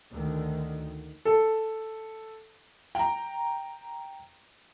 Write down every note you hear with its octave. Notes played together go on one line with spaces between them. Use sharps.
D2 D3 D#3
A4
G5 A#5